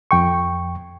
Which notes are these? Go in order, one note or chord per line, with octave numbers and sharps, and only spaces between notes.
F2 G5 C#6